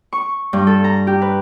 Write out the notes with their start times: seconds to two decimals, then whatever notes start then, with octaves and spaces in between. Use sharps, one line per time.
0.13 C#6
0.53 G2
0.67 A4
0.84 A#5
1.07 G4
1.22 B4